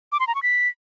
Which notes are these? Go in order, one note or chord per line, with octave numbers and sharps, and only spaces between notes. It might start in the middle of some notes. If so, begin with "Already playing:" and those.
D6
C6
A#5
C#6
B6